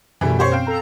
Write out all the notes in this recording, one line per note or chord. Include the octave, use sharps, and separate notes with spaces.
F#2 B2 E3 G3 A3
G4 C5 C#5
C4 F5 G5
A4 A#5